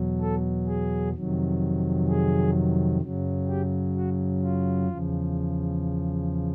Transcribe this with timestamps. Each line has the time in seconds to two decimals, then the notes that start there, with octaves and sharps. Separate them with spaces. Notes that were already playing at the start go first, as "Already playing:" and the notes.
Already playing: E2 B2 F#3
0.21 A4
0.67 G#4
1.15 F2 C3 D#3 F#3
2.08 G#4
3.02 F#2 C#3 F#3
3.48 G4
3.95 F#4
4.42 F4
4.89 E2 C#3 F3